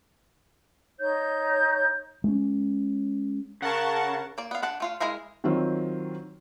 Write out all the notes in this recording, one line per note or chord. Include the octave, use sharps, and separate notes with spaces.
D#4 C#5 G6
G#3 C#4
C#3 A#4 F#5 A5 C#6
A#3 D5
B3 F5
D4 F#5 A5
A3 F4 F5
G#3 E4 A#4 F5
D#3 F#3 C4 F4